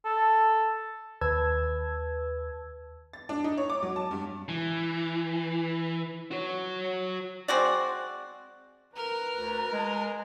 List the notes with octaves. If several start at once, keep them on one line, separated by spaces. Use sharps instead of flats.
A4
D#2 B4 A5 E6 G#6
A6
D4
D#4
C#5
D6
F#3
A5
G2
E3
F#4 C#5
G#3 C4 F#4 D5
A#4 B4 A#5
D2
G#3